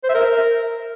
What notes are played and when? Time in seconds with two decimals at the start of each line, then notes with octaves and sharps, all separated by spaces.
0.04 C5
0.09 E5
0.15 A#4